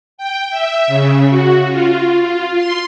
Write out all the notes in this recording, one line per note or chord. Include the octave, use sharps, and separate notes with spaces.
G5
E5
C#3
F#4
F4
F4
C6